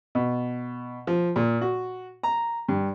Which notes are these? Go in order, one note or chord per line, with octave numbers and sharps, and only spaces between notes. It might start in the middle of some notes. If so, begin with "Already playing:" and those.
B2
F3
A#2
F#4
A#5
G2